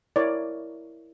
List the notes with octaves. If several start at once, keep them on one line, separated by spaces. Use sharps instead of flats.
E4 A#4 C#5 D5